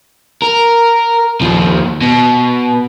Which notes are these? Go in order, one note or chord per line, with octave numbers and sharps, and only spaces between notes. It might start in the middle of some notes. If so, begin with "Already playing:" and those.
A#4
D#2 F3
B2